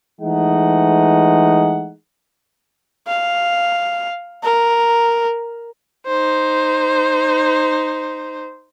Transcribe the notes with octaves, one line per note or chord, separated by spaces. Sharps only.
E3 G#3 A3 D#4 F#5
F5
A#4
D#4 C5